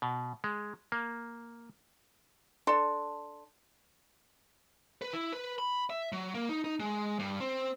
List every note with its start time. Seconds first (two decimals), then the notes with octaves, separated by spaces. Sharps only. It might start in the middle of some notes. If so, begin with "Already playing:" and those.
0.02 B2
0.44 G#3
0.92 A#3
2.67 D4 A4 C6
5.02 B4
5.13 E4
5.32 B4
5.59 B5
5.90 E5
6.12 F#3
6.35 A#3
6.49 D#4
6.64 D#4
6.80 G#3
7.19 G2
7.40 C4